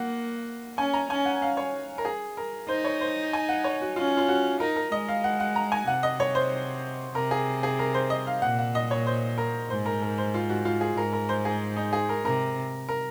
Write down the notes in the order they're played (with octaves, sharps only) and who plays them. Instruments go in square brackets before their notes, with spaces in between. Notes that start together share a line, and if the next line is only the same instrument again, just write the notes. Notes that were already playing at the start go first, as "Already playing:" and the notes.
Already playing: [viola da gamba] A#3 [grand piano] F#5
[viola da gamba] C#4 [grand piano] G#5
[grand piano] A#5
[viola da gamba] C#4 [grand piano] G#5
[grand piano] F#5
F5
C#5
A#4
G#4
A#4
[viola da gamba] D#4 [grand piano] C5
[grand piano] C#5
C5
G#5
F#5
C#5
F#4
[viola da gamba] C#4 [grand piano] F4
[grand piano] F4
F#4
[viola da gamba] D#4 [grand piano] A#4
[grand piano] A#4
[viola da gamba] G#3 [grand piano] D#5
[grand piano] F5
F#5
F#5
A#5
G#5
[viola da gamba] C3 [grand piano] F#5
[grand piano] D#5
C#5
C5
[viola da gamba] C3 [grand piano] A#4
[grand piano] G#4
G#4
A#4
C5
D#5
F5
[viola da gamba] A#2 [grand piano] F#5
[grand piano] F#5
D#5
C#5
C5
A#4
[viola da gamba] G#2 [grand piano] C5
[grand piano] A#4
A#4
C5
F4
F#4
F4
G#4
[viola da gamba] G#2 [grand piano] A#4
[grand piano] A#4
C5
G#4
D#4
G#4
A#4
[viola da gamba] C3 [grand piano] A#4
[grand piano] A#4